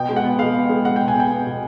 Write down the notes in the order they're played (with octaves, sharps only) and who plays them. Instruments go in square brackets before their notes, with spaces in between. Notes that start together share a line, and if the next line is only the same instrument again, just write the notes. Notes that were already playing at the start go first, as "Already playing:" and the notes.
Already playing: [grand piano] B2 G5
G#3
F#5
B3
G#3 F5
B3
G#3
G#3 F#5
B2 G5
G#5
B3 G5
B3
B2